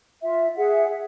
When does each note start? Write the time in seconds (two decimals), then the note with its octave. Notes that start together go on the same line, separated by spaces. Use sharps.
0.22 F4 E5
0.56 G#4 E5 F#5